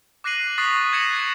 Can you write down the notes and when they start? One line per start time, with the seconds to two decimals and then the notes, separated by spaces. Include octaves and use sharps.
0.24 D6 F#6 A#6 C7 D#7 F#7
0.58 C#6 D#6 F#6 A6 B6 C7
0.76 A6
0.92 D6 G#6 A#6 C#7 E7 F#7
1.09 F#6 G#6